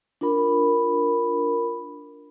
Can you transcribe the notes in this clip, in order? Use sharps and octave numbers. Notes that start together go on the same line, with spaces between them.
D4 F4 A#4 B5